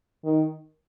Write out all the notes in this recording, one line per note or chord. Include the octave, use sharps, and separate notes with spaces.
D#3